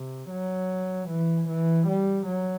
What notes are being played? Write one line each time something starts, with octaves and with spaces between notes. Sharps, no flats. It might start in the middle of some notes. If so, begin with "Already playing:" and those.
Already playing: C3
F#3
E3
E3
G3
F#3